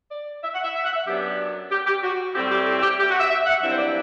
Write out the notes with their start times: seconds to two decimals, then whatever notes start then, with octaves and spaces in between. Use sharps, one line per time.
0.11 D5
0.43 E5
0.54 F#5
0.64 E5
0.75 E5
0.84 F#5
0.93 E5
1.06 F#2 F#3 B3 D4 G4
1.71 G4
1.87 G4
2.03 F#4
2.35 A2 G3 C4 E4 G4
2.51 G4
2.66 A4
2.82 G4
2.99 G4
3.10 F#4
3.20 E5
3.31 E5
3.46 F#5
3.62 G2 F#3 C4 E4 E5
3.71 C5
3.78 D5